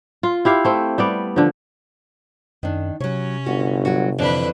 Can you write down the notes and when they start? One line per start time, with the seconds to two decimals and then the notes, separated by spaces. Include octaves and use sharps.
0.23 F4
0.45 E4 G4 F5
0.65 A3 C4
0.98 G3 B3 D5
1.36 D3 F3
2.63 F#2 D#3 D4
3.00 C3 F#3 C#4 C#5
3.46 G1 F#4
3.85 F#3 F#4
4.18 F2 D3 E3 D4 B4